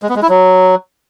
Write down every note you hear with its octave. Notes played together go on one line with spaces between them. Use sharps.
G#3
B3
G#3
E4
F#3